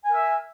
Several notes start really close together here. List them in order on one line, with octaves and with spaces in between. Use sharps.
G#5 A#4 E5